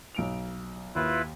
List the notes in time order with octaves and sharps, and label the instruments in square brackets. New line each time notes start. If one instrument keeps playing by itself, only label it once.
[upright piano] B1 D7 F7
[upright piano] D#2 [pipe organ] E4 F4 B4